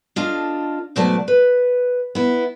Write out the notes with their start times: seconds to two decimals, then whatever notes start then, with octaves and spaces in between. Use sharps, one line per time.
0.16 D4 F4 A4 D#5
0.96 G#2 B2 F#3 A3 D5 A5
1.28 B4
2.15 B3 E4